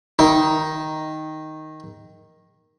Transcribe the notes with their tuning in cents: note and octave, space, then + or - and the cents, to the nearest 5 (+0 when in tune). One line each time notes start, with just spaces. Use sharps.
D#3 +0 D#4 +5